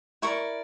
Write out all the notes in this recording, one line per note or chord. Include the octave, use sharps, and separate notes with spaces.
E4 A#4 D5 C#6